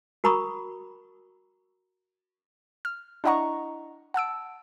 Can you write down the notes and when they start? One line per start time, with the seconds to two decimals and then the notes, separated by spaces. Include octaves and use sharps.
0.24 F#4 A#4 A#5 B5 C#6 D#6
2.85 F6
3.24 D4 E4 D#5 F#5 A#5 C#6
4.14 F#5 A5 E6 D7